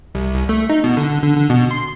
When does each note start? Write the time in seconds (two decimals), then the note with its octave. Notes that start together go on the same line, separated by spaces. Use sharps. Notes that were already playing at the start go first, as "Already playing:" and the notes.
0.15 C2
0.35 C2
0.49 A3
0.70 D#4
0.84 B2
0.97 D3
1.22 D3
1.36 D3
1.50 B2
1.71 C6